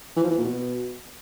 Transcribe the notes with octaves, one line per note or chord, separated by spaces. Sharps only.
E3
F3
E3
A#2
B2